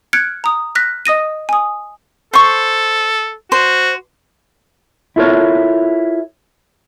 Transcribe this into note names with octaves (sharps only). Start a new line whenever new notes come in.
F6 F#6 G#6 C#7 D7
A#5 D#6
F6 F#6 A#6 B6
D#5 D#6 A#6 D#7
G#5 D#6
A4 C5 C#6
F#4 C5
E4 F4 A4 A#4 C#5